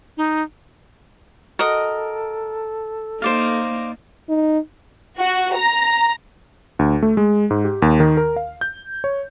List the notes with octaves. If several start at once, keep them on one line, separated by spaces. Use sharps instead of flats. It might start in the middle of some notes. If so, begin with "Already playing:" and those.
D#4
F#4 A4 A#4 D#5
A#3 D#4 C5 D5 F5
D#4
F#4
A#5
D2
A3
G#3
G#2
G4
D#2
D#3
A#4
F5
G6
C#5